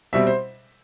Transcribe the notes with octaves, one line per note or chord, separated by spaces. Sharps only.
B2 G3 C4 E5
C5